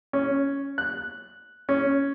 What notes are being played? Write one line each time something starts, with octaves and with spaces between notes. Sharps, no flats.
C#4
F#6
C#4